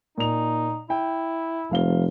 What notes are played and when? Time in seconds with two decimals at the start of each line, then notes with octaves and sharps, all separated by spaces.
0.18 A#2 D#4 F7
0.90 E4 G5
1.71 F1 F3 F5 G7